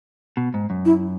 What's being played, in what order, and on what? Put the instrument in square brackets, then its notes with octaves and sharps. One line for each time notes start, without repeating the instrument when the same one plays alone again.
[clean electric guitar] B2
G#2
F#2
[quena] E4